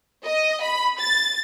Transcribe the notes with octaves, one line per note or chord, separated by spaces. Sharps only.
D#5
B5
A6